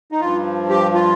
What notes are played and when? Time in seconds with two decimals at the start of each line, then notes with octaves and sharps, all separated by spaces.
0.12 D#4
0.20 G2 F3 F4
0.70 G4
0.94 F4